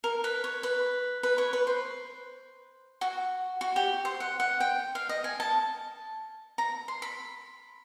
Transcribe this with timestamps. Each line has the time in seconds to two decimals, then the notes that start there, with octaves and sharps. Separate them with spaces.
0.04 A#4
0.24 B4
0.44 C#5
0.63 B4
1.23 B4
1.38 C#5
1.53 B4
1.67 C5
3.01 F#4
3.61 F#4
3.76 G4
4.05 C5
4.20 F#5
4.40 F#5
4.60 G5
4.95 F5
5.09 D#5
5.24 G#5
5.40 A5
6.58 A#5
6.88 C6
7.02 B5